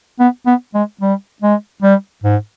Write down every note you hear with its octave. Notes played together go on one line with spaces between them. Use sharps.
B3
B3
G#3
G3
G#3
G3
G#2